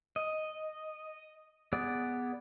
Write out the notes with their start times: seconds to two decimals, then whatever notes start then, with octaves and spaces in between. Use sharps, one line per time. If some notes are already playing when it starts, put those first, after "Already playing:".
0.16 D#5
1.73 B3 G#4 D5